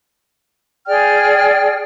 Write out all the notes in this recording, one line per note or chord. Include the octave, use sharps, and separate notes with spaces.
G#4 D5 G5 F6